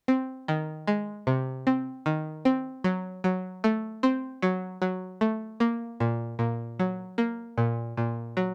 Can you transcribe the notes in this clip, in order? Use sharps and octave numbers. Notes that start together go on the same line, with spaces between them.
C4
D#3
G#3
C3
C4
D#3
C4
F#3
F#3
A3
C4
F#3
F#3
A3
A#3
A#2
A#2
F#3
A#3
A#2
A#2
F#3